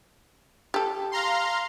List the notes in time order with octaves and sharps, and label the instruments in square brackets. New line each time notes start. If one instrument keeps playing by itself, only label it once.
[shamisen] G4 A4
[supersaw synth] F5 A#5 C6